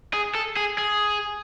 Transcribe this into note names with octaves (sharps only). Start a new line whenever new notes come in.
G#4
A4
G#4
G#4